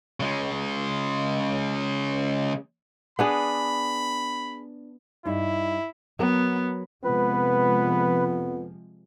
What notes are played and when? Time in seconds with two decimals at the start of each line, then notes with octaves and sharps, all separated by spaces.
0.20 C#3 G#3
3.19 B3 D4 G#4 B5
5.25 G2 D#4 E4
6.19 F#3 B3 A#4
7.04 F2 C3 F3 G#3 B3 B4